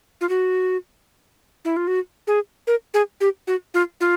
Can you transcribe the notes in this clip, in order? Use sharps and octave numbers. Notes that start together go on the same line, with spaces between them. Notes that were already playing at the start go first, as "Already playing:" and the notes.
F4
F#4
E4
F4
F#4
G#4
A#4
G#4
G4
F#4
F4
F4